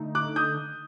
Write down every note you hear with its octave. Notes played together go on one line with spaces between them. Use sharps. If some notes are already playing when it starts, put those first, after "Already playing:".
Already playing: D3 A3 D#4
D6 F#6
D#6 G6